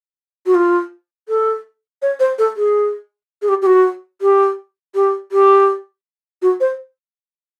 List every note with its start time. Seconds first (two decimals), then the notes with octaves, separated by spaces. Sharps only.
0.46 F#4
0.55 F4
1.29 A4
2.02 C#5
2.20 C5
2.39 A4
2.57 G#4
3.42 G#4
3.49 G4
3.62 G4
3.66 F#4
4.22 G4
4.95 G4
5.32 G4
6.42 F#4
6.60 C5